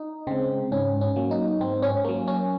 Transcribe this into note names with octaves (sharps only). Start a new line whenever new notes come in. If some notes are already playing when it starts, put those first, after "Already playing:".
Already playing: D#4
C#3 G#3 C4
G#2 C#4
C#4
F#3 A#3
D#4
G#2 C4
C#4
F#3 A#3 C#4
C#4